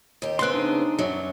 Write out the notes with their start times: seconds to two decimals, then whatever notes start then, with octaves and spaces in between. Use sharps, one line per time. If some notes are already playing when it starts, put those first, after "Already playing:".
0.22 D#2 G4
0.39 C#3 B3 C4 C6 F#6
0.54 D4 D#4
0.99 F#2 F#3 G3